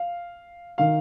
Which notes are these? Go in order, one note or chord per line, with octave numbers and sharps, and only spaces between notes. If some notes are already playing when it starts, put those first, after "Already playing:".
Already playing: F5
D#3 F5